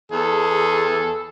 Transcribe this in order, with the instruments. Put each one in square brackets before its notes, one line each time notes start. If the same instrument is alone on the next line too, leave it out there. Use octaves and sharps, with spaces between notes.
[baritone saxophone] E2 [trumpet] G#4 [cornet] A4